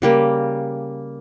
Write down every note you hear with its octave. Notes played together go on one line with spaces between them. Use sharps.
C#3 G3 A#3